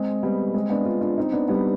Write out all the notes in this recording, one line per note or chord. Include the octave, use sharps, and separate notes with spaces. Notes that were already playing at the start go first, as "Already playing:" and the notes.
Already playing: G#3 C4
G3 B3
G#3 C4
B3 D4
D4 F4
D4 F4
C4 D#4
B3 D4
G3 B3